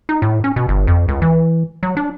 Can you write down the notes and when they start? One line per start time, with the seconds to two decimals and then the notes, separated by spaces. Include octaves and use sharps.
0.09 D#4
0.22 A2
0.44 C#4
0.56 B2
0.69 G1
0.87 F2
1.08 C#2
1.22 E3
1.83 F#3
1.97 D4